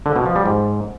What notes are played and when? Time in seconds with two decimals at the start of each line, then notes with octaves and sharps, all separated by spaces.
0.06 D3
0.16 B2
0.26 F3
0.36 G3
0.46 G#2